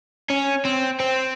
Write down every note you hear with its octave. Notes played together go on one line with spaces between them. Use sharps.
C#4
C4
C4